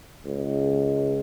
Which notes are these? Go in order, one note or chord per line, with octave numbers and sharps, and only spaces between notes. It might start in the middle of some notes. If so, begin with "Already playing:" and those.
C#2